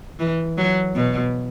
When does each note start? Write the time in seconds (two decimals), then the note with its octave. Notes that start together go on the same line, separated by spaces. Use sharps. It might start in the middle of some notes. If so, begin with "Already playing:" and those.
0.19 E3
0.57 F#3
0.95 B2